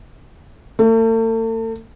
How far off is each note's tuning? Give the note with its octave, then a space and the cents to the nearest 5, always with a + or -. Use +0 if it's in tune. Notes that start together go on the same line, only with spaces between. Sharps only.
A3 +40